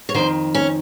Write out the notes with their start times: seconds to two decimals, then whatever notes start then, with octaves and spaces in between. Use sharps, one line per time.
0.09 C#5
0.14 F2 D#3 C5
0.55 C#4